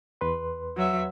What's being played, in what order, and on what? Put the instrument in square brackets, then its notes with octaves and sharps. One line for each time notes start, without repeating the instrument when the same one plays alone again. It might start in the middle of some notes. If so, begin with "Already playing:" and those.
[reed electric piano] E2 B4 C6
[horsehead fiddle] F#3 E5